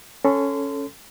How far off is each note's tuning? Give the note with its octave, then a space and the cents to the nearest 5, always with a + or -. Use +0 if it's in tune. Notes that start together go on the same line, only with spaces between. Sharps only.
C#4 +0 A4 +0 C6 -30